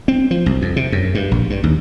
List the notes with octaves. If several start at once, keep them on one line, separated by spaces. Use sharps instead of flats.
C4
F3
C2
F2
C3
F#2
G2
A#1
G2
D#2